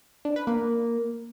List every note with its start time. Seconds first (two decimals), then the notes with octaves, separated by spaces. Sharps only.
0.25 D4
0.36 B4
0.47 A#3